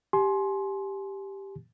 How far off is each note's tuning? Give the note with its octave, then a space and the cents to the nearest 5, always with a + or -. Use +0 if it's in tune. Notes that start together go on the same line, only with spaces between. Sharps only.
G4 +0 G#5 +35 C6 +10